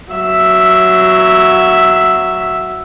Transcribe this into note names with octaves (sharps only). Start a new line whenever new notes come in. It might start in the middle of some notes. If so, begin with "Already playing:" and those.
F#3 E5